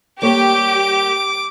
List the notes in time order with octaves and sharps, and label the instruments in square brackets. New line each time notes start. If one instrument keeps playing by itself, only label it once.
[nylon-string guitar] G3 A#3 C#5 [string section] G4 [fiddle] D6